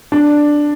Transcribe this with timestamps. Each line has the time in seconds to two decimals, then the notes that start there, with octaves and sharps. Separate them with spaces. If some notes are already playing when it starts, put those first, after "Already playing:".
0.12 D4